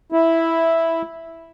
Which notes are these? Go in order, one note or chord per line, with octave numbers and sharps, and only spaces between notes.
E4